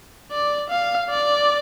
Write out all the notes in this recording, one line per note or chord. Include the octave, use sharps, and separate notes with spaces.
D5
F5
D5